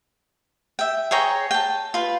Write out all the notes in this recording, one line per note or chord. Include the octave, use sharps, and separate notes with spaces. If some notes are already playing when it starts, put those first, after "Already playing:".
E5 G5
G#4 C#5 G5 A#5
G5 A5
F4 B4